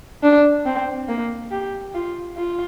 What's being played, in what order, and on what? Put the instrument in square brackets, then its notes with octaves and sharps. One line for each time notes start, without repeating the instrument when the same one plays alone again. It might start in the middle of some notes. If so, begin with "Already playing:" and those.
[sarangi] D4
C4
A#3
G4
F4
F4